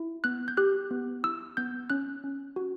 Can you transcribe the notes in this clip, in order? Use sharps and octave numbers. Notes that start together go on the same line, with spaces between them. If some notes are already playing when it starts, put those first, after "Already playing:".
Already playing: E4
B3 F#6
G6
G4 F#6
B3
E4 E6
B3 G6
C#4 F#6
C#4
F#4